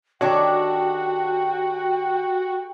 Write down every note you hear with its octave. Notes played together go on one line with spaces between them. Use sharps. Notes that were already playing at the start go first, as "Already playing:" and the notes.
D#3 D4 F#4 G4 A4 C#5 G5